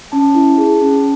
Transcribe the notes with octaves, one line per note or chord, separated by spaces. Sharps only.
C#4 A5
E4
G#4
C#4